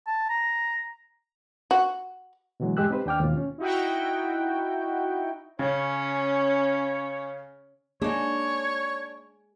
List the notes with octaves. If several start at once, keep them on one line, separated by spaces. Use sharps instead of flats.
A5
A#5
F#4
B2 D3 E3 F#3 G#3
E2 G#2 G#3 G4 E6 F#6
C4 D#4 G4 B4 C5
D#2 D4 G5 D6 F6
D#2 G#2 B2 F4
C#4
D#4 E4 F#4 G5
C#3 C#4 C#5
A#3 D4 D#4 G#4 C#5